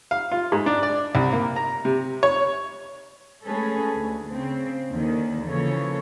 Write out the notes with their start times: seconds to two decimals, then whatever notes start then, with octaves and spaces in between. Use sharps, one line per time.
0.11 F5
0.32 F4
0.52 G#2
0.66 D4
0.83 D5
1.15 C2
1.33 A#3
1.56 A#5
1.85 C3
2.23 C#5
3.45 G#3 A3 C#4 G#4 A4 B4
3.97 D2
4.32 C#3 C4
4.90 D#2 D3 D#3
5.46 C#3 E3 F3 A#3 A4 C#5